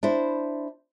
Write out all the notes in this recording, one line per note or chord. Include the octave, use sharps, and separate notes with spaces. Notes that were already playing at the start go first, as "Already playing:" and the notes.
D4 E4 C5